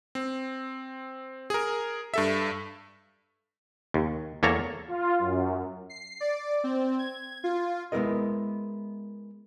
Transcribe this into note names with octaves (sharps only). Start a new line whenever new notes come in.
C4
G#4 A#4
G2 A4 E5
D#2
E2 A#3 A4 C#5 A#5
F4
F#2
C7
D5
C4
G#6
F4
G#3 B3 E4 A#4 D#5